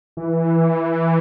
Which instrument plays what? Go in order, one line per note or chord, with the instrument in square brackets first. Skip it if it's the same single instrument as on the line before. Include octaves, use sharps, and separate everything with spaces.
[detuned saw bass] E3